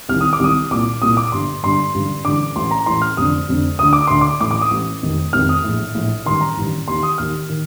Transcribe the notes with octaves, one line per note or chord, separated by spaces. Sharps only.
C2 C3 D#3 F6
D#6
D6
C2 C3 D#3 D#6
C2 A#2 D6
C2 A#2 D#6
D6
G1 G2 D3 C6
G1 G2 D3 C6
A1 G2 D3
A1 G2 D3 D6
A1 A2 C6
A#5
A1 A2 C6
F6
F1 F2 D3 D#6
F1 F2 D3
D2 D3 D#6
D6
D2 D3 C6
D6
A1 A2 D6
D6
D#6
A1 A2
F1 F2 C3 D#3
F1 F2 C3 D#3 F6
D#6
A#1 A2
A#1 A2
A1 G2 D#3 C6
A#5
A1 G2 D#3
D#2 D#3 C6
D#6
D#2 D#3 F6
D#3